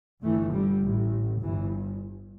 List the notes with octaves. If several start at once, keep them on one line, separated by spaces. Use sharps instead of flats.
G1 G2 E3 A3
D3 G3
A1 A2
G1 G2 E3